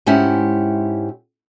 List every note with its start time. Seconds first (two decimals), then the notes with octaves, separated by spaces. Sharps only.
0.06 G#2 G#3 C#4 E4 G4 F#5